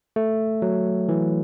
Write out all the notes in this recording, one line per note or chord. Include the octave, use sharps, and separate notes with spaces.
A3
F#3
E3